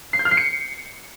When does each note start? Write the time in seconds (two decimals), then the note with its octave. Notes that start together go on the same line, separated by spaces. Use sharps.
0.13 C7
0.19 G6
0.25 F6
0.31 C7
0.37 C#7